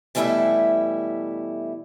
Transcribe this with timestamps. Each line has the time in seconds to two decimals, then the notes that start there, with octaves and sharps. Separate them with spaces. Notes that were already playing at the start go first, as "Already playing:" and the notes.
0.15 B2 E3 G3 A3 E4 E5